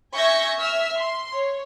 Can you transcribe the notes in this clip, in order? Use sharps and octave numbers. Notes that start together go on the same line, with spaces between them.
E5 G#5 C#6 G6 G#6 A#6
E5 E6 F6
C6
C#5